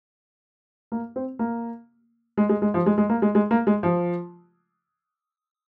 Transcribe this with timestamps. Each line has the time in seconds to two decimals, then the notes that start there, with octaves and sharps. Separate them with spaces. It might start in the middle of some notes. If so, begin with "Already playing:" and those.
0.92 A#3
1.16 C4
1.39 A#3
2.37 G#3
2.49 G#3
2.62 G#3
2.74 F3
2.86 G#3
2.98 G#3
3.09 A#3
3.22 G#3
3.35 G#3
3.51 A#3
3.67 G#3
3.83 F3